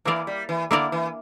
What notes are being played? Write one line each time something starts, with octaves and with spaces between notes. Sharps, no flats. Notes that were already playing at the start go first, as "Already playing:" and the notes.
E3 A#3 E4 A#4 D5
G3
E3
D3 A#3 E4 A#4 D5
E3